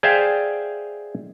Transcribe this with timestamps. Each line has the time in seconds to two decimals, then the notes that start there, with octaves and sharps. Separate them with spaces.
0.03 G#4 C5 D5 E5 F5 G5